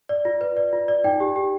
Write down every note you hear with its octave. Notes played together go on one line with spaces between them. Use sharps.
D5
F4
B4
D5
F4
D5
D#4 G5
G4
G4